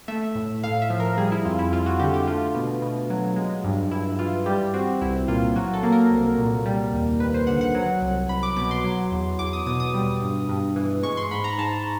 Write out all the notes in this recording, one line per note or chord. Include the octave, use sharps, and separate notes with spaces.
A3 E5
A2
A2 F5
E5
F3
A#4
G3 G#4
E4
F2 F4
E4
F2 F4
F#4
D3 G4
G4
A3 F4
B2
B2
F#3
G#3
G2
G2 E4
E3 F4
G3 G4
C4 F#4
C2 E4
A#2 F4
F#3 F#4
A4
A#3
A#4
C2
A#2
G3
D#2
D#2 B4
C5
D3 F#5
F#5
F#3
C2
C2 B5
D6
B2 D6
C6
F#3
E2
E2 D6
D#6
B2 D#6
D#6
G3
G2
G2
E3
G#3 C#6
C6
G#2 B5
A#5
G#2 A5